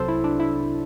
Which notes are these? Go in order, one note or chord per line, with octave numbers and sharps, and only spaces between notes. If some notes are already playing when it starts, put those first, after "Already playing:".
Already playing: C2 C3 F#3 A4 C5
E4
D4
E4